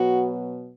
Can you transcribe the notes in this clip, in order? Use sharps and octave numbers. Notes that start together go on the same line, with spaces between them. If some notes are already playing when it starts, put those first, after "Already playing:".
Already playing: B2 F#3 B3 F#4